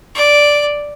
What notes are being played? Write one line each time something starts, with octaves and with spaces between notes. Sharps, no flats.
D5